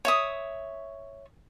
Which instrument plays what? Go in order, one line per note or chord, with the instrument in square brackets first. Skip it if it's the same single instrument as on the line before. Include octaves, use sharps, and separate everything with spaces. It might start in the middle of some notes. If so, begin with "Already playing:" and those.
[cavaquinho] C#5 E5 D#6